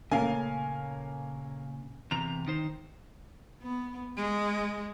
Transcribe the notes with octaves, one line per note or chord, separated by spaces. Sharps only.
A#2 C#3 A3 A#3 C#4 A#4 F5 G#5
E2 C3 A#5 F7
D#3 D#4 C5
B3
G#3